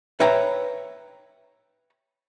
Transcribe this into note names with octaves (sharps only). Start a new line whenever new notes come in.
B4 C#5 E5 G5 A#5